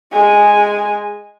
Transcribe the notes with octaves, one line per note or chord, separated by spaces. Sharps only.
G#3 G#5